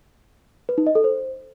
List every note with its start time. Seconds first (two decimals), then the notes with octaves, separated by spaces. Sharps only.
0.69 B4
0.78 D#4
0.87 D#5
0.95 A4
1.04 C5